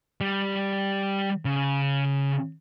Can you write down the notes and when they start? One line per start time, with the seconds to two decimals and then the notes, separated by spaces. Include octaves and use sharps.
0.21 G3
1.45 C#3